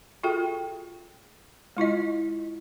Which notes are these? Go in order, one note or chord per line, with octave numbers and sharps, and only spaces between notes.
F4 F#4 G#4 A4 E5 G5
G#3 E4 F4 D#5